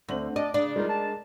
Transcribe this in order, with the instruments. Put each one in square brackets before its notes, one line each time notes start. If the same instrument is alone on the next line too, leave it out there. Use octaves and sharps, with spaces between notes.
[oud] D2 [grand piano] A3 C4 F#7
[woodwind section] D4 D5 [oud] D#5 [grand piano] D6
[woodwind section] C#3 [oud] D4
[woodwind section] G3 D#4 F4 [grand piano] G#3 A#4
[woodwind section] A5